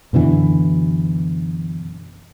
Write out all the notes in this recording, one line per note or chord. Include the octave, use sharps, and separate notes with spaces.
F#2 B2 D3 E3